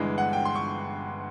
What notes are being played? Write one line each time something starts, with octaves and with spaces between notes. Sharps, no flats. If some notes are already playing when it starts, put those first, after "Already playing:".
Already playing: G1 G2 E3 G#3
F#5
G5
C6
C#6